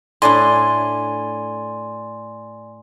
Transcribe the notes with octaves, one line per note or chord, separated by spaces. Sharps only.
A2 D4 E4 D5 G#5 C6